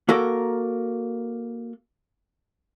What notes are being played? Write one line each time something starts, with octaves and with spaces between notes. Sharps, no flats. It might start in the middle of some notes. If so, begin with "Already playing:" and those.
A#3 F#4 A4 A#4